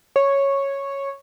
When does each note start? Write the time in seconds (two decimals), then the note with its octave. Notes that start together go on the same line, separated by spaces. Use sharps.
0.16 C#5